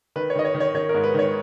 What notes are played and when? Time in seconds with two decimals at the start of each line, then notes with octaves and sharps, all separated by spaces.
0.16 D#3 B4
0.30 C#5
0.35 D#3 D#5
0.45 C#5
0.55 D#3
0.60 C#5
0.74 D#3 C#5
0.89 A#4
0.94 G#2
1.04 B4
1.14 D#3 C#5